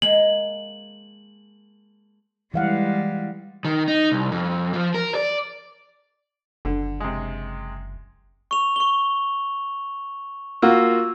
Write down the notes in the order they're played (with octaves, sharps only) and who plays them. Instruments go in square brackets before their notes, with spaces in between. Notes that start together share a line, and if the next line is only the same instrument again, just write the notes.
[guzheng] G#3 A#3 [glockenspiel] F#7
[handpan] E3 F5 F#5 [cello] G3 G#3
[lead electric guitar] D#3
D#4
C2
F2
F3
A#4
D5
[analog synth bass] F#1 [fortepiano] D3
[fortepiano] C3 G#3
[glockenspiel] C#6 F7
C#6 G7
[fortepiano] A#3 F4 F#4 [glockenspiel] E6